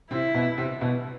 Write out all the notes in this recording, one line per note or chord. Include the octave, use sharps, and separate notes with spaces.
C3 C4 E4
B2 B3
C3 C4
B2 B3